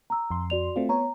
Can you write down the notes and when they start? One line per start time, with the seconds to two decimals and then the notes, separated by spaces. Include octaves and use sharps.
0.10 A#5 E6
0.31 F2 C6
0.50 F#4 D5 F7
0.76 A3 C4 F4
0.89 B3 C#5 A#5